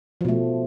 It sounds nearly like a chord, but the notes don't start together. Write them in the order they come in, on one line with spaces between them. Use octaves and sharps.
F3 B2 A3